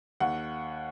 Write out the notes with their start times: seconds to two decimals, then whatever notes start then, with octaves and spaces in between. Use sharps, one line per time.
0.20 D#2 F#5